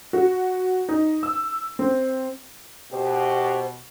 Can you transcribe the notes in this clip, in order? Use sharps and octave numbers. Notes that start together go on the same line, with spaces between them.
F#4
D#4
E6
C4
B2 G4 C5